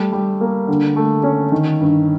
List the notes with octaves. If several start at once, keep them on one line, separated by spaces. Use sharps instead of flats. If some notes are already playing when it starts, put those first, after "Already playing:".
Already playing: G3 A3
G3
A#3
D3
A3
C#4
D#3
G2